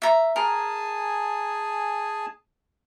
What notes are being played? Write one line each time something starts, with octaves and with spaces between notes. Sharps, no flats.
E5 A#5
G#4 A#4 G#5 A5